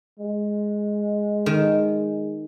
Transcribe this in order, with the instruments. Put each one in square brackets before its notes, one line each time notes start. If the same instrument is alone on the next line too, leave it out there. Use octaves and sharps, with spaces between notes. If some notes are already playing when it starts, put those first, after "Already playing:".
[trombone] G#3
[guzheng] D#3